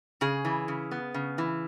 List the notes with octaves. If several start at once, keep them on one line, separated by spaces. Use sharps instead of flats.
C#3 G#4
E3
C#3
B3
C#3
E3